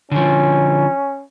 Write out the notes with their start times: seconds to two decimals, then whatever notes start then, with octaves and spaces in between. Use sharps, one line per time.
0.11 D3 F3 C#4